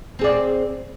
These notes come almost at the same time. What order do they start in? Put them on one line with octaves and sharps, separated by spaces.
C4 G#4 D5